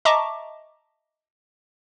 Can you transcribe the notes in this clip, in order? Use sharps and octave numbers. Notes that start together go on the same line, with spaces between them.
D#5 E5 A5 A#5 C#6 D6